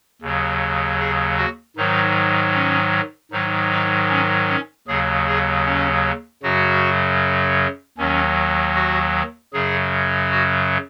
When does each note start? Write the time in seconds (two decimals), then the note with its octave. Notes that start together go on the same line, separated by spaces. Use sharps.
0.22 D#2 C#3 F#3
0.99 G#4
1.38 F#4
1.77 G#2 D#3 F#3 D#4
2.54 C#4
3.32 G#2 D#3 F#3 D#4
3.71 D#4
4.10 C#4
4.48 C#4
4.87 D#2 C#3 F#3 G#4
5.27 G#4
5.65 C#4
6.43 F#2 C#3 F#3 F#4
7.98 D#2 D#3 F#3 C#4
8.75 F#4
9.53 F#2 C#3 F#3 G#4
10.31 F#4